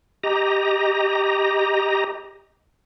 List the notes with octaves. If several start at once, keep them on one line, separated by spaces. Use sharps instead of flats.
G4 D#5 A#5